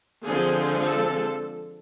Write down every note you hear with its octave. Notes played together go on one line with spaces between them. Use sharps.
D3 F3 G#3 C4 G#4
A4